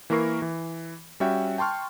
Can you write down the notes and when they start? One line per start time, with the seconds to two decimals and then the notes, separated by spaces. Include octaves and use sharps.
0.10 E3 A#3 E4 A#4 C#6 C7
0.42 E3
1.20 G3 C#4 F#4 E5 G5
1.58 G5 A5 C6 C#6 F6